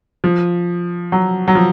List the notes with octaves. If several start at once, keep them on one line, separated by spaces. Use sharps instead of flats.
F3
F#3
F#3
F3